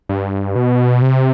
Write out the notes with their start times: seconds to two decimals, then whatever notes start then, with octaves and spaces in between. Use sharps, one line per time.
0.09 G2
0.56 B2
1.02 C3